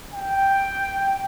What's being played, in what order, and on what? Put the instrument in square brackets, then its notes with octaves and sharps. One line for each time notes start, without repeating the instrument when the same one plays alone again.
[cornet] G5